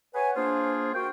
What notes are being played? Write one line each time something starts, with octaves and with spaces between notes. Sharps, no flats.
B4 C#5 F#5 G#5
A#3 D4 F4 G#4 C5
F#4 A#4 G5